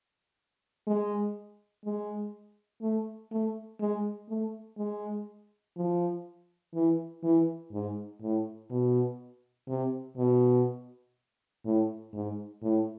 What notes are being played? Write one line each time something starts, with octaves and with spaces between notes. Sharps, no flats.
G#3
G#3
A3
A3
G#3
A3
G#3
F3
E3
E3
G#2
A2
B2
C3
B2
A2
G#2
A2